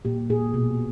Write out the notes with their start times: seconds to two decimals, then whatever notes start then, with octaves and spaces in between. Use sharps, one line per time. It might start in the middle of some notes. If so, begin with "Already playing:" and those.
0.05 A#2 G4
0.30 A#2 G#4
0.54 B2